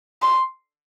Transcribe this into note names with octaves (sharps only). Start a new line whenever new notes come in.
C6